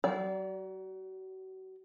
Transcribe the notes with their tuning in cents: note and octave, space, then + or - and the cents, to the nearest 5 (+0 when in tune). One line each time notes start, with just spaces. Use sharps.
F#3 +35 D5 -25